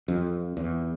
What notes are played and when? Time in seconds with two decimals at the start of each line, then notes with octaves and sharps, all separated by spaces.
0.08 F2
0.57 E2